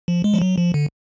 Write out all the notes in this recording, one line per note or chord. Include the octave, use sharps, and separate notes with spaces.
F3
G#3
F3
F#3
F3
D3